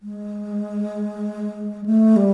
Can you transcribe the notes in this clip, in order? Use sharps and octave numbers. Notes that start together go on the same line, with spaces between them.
G#3
A3
G3